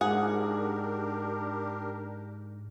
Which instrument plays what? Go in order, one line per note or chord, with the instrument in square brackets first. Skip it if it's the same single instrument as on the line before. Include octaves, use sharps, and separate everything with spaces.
[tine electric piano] G#2 [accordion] D4 G4 A#4 [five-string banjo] G#4 F#5